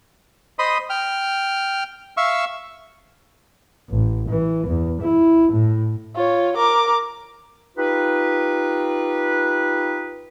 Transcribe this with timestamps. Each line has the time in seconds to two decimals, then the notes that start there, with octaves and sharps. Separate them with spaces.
0.59 C5 D#5 B5 C6 D#6
0.90 G5 F6
2.17 E5 F5 C#6 E6
3.89 A1
4.29 E3
4.67 E2
5.02 E4
5.52 A2
6.15 F4 C#5
6.57 A#4 D6
7.77 D#4 F4 G4 B4